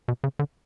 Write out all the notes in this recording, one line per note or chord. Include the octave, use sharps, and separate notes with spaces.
B2
C#3
D3